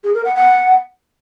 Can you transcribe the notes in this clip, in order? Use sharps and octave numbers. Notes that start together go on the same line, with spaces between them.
G#4
A#4
F#5
F#5